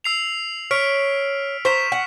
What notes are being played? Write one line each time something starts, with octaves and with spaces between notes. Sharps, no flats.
E6 C7 F7
C#5 F6 B6 D7
C5 A#5 C#6 B6 E7
F#5